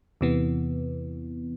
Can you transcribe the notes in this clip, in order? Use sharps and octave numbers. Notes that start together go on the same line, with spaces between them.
E2 C3 E3 B3